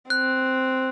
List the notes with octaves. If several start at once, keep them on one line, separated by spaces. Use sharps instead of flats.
C4 F#6